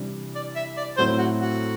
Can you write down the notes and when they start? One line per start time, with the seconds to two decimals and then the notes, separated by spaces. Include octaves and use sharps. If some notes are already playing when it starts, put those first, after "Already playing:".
Already playing: C3 E3 G3 D4
0.35 D5
0.56 E5
0.77 D5
0.97 A2 F#3 C4 E4 C5
1.18 F#4
1.39 F#4